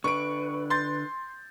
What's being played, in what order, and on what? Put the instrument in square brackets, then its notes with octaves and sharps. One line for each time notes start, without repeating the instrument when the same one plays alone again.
[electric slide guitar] D3 B4 [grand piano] C#6 D7
[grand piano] C6 G6 A6